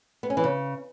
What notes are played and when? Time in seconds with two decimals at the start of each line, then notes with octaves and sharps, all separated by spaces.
0.23 B3
0.30 C#4
0.37 E3
0.44 C#3